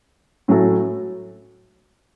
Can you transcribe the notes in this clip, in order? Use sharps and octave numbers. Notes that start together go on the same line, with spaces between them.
A2 F#3 C#4 F#4 A4